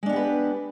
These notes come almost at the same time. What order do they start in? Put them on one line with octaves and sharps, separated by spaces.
G#3 D4 B3 G4 B4